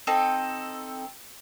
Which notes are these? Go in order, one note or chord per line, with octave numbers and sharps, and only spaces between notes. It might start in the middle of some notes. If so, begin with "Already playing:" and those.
C4 D#4 A4